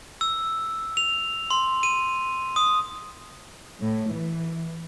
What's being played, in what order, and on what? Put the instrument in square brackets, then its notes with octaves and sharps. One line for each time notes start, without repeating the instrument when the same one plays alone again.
[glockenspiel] E6
F7
C6
D#7
D#6
[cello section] A2
E3